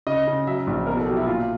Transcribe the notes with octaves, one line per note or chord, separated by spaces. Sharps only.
C#3 D#5
C#3
F#3 E5
A#1
B2 A#4
A4
F#3 G4
E4
A#2 F4